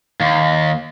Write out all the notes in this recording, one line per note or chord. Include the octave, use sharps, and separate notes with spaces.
D#2